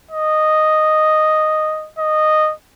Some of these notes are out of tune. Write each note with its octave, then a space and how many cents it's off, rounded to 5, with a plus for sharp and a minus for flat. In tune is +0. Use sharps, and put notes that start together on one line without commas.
D#5 -5
D#5 -10